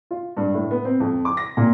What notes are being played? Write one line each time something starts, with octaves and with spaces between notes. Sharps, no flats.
F4
G2
A2
B3
C4
F2
D6
A#6
A#2